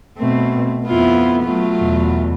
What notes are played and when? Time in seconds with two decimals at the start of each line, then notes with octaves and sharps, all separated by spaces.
0.18 B2 A3 C4
0.87 F2 B3 E4 F4
1.42 F#3 A3 F4
1.80 E2 B2